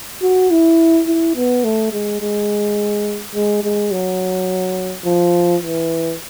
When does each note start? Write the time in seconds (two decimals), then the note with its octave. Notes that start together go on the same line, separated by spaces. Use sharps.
0.22 F#4
0.51 E4
1.07 E4
1.35 B3
1.64 A3
1.92 G#3
2.21 G#3
3.35 G#3
3.64 G#3
3.91 F#3
5.05 F3
5.63 E3